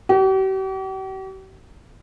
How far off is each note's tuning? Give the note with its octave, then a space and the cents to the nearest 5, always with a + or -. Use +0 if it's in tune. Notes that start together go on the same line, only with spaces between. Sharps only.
G4 -45